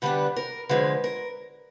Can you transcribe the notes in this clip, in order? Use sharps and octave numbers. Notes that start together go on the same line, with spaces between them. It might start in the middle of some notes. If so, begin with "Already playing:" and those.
D3 G3 B3 D4 B4
A#4
D3 F3 G#3 B4
A#4